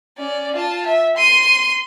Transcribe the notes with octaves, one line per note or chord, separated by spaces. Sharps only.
C#4 D5
F4 A5
E5
C6 D#7